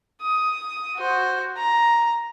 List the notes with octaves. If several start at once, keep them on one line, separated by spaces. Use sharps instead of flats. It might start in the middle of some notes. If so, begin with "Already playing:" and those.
D#6
F#4 C5
A#5